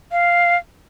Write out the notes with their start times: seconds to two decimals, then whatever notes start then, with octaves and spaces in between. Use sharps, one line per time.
0.12 F5